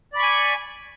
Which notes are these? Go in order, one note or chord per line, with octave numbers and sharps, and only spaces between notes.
D5 G#5 B5 C#6